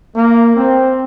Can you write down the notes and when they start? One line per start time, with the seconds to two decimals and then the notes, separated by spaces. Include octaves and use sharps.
0.16 A#3
0.56 C4